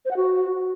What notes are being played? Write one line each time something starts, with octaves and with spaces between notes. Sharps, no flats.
C5
F#5
F#4